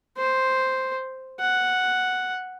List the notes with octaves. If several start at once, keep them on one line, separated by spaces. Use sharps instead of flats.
C5
F#5